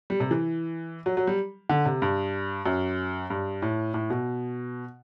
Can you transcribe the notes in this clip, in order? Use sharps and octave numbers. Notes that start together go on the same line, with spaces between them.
G3
C3
E3
F#3
F#3
G3
D3
C3
G2
F#2
G2
A2
A2
B2